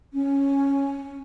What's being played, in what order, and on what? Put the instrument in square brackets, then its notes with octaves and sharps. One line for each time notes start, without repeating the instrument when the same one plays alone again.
[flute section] C#4